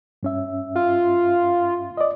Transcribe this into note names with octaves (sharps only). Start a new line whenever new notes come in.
G2 C#4 E5
F4
D5 D#5